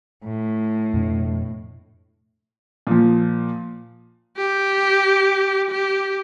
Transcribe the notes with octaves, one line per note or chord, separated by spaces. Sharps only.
A2
F2 B2 D4
A#2 F3
G4
G4